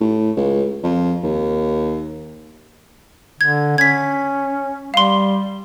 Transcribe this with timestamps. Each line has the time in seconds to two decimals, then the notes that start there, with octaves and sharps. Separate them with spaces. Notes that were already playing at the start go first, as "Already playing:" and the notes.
0.01 A2
0.37 C#2
0.84 F2
1.23 D#2
3.41 D3 G#6
3.78 C#4 G#6 B6
4.94 G3 F5 C6